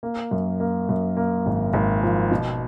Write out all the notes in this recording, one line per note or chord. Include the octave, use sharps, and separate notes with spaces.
A#3
F#2
A#3
F#2
A#3
G#1
G#1
F3
B2